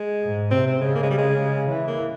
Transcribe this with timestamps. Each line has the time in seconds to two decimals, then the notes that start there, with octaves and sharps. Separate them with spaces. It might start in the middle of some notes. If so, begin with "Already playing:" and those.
Already playing: G#3
0.22 G#2
0.51 C3 C4
0.67 C4
0.81 C#3 G#3
0.95 A#3
1.03 G#3
1.11 G3
1.18 G#3
1.68 E3
1.88 A#3